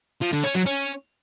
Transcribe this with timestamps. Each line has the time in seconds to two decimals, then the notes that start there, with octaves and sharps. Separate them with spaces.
0.22 F3
0.33 D3
0.44 C#4
0.55 F#3
0.66 C#4